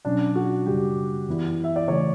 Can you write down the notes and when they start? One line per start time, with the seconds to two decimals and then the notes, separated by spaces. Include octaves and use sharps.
0.05 B2 F#3 C#4 D4
0.36 F#4
0.66 F#2 C#3 G3 G4
1.28 F#2 E3 B3 E4
1.64 E5
1.76 D5
1.88 C#3 E3 A3 C#5